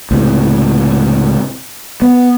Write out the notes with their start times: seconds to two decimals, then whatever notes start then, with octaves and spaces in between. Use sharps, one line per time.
0.11 C#2 A2 C3
2.02 B3